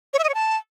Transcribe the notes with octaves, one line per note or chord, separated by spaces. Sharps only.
C#5
E5
D#5
C#5
A5